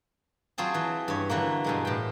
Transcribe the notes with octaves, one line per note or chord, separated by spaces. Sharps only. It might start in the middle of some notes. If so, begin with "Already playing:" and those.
F#3 C4 F4 G#4 A5
E3
G2 C#5
D3 E3 F#3 A#3
G2 B2 G#3
A2 G5